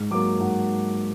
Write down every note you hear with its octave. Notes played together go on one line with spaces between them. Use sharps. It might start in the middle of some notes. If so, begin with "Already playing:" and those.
Already playing: G#2
F#3 A#3 D6
G#2 F#5